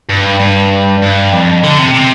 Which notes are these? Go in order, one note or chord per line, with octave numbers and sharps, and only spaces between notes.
G2
G2
G2
F2
D3
C3
C3